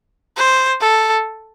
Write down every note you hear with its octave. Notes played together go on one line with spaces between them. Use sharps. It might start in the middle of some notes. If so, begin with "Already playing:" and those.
C5
A4